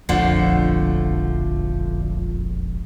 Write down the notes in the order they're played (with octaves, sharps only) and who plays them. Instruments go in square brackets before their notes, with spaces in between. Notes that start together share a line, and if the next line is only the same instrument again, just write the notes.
[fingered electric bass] E1 A#1 F2 [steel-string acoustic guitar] D3 F3 A3